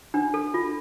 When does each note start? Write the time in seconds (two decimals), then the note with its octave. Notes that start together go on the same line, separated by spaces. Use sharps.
0.14 D4
0.34 A4
0.54 F4